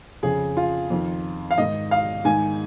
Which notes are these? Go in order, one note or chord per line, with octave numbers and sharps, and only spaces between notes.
F2 C#3 G#4
F4
F2 D#3
F5
G#2 D#3 D#5
F5
G#2 D#3 G#5